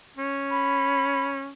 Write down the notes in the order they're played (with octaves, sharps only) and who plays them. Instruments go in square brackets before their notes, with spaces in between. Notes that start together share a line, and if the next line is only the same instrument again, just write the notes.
[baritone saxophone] C#4
[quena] B5